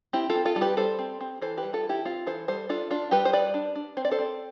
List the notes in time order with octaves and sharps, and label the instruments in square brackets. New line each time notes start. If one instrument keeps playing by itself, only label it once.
[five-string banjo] C4 E4 G4
F4 A4
C4
F4 A4
G3 A4
G4 B4
G3 A4 C5
C4
C4
E3 A4 C5
G4 B4
G3
F4 A4
E3
E4 G4
C4 F4
E3 A4 C5
G3 A4 C5
D4 F4 A4
D4 F4
G3 G4 B4
C5
G3 B4 D5
D4
D4
C4 C5
D5
A4 C5
C4